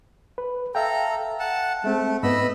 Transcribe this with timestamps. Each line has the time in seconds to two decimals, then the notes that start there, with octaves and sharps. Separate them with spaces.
0.38 B4
0.75 A4 E5 F5 G5 A#5
1.40 F#5 A5
1.84 G#3 A3 C4
2.23 G#2 B3 B4 D#5 B5 E6